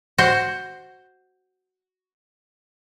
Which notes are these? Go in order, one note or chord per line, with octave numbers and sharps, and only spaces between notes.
F#4 C5